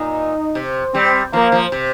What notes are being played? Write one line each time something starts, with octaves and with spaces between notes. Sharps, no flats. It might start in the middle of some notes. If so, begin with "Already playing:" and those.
Already playing: A#2 D#4
C3
G3 C4
F3 A#3
F3
C3